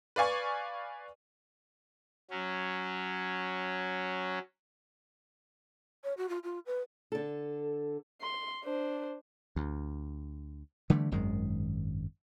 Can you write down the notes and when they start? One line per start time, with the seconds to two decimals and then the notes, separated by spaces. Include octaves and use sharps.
0.16 B4 D5 F5 G#5 C#6
2.30 F#3 C#4
6.04 C#5
6.18 F#4
6.29 F4
6.44 F4
6.66 B4
7.12 D3 A4
8.21 C6
8.64 D4 C5
9.56 D2
10.90 D3 E3 G3 A3
11.12 G#1 F#2 D#3 G#3